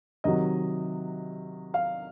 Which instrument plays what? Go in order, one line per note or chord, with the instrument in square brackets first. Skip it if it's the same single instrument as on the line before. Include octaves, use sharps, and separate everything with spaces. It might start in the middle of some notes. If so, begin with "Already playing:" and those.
[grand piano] C3 D#3 F#3 D#5
F5